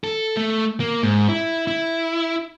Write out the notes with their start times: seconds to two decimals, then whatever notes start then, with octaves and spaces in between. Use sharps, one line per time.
0.04 A4
0.37 A3
0.80 A#3
1.03 G#2
1.29 E4
1.67 E4